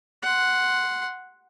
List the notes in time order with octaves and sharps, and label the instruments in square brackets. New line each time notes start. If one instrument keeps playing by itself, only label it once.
[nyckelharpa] F#5 C6